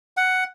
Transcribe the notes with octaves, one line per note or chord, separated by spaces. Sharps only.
F#5